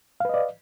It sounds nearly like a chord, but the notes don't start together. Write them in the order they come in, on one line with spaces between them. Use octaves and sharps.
F5 B4 D#5 D5